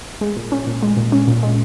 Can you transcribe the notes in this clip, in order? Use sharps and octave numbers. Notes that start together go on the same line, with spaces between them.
G#3
A#2
C#4
A#2
G#3
A#2
C#4
A#2
G#3